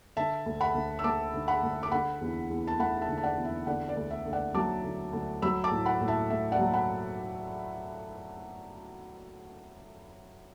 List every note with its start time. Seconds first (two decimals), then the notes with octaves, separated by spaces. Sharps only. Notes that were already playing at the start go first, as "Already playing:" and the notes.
0.17 D3 E5 A5
0.46 D2
0.60 F#5 B5
0.75 D2
0.99 E6
1.04 A3 A5 D6
1.34 D3
1.48 F#5 B5
1.63 D2
1.83 D6
1.91 D3 F#5 B5
2.21 E2
2.50 E2
2.67 A5
2.79 A3 F#5 B5
3.02 E5 A5
3.09 D3
3.17 A5
3.23 D5 F#5
3.38 E2
3.45 E5
3.67 D3 D5 F#5
3.89 D5
3.97 D2
4.11 E5
4.26 D2
4.33 D5 F#5
4.54 F#3 A5 D6
4.84 D3
5.13 D2
5.42 F#3 B5 E6
5.64 A5 D6
5.71 A2
5.85 F#5 B5
6.01 A2
6.08 E5 A5
6.30 A3 E5
6.52 D5 F#5
6.59 F#3
6.73 F#5 B5